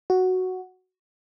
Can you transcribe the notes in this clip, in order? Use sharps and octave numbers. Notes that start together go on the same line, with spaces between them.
F#4